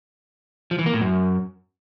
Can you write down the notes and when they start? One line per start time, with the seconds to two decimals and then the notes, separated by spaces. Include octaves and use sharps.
0.71 F3
0.79 E3
0.86 A#3
0.94 A2
1.01 F#2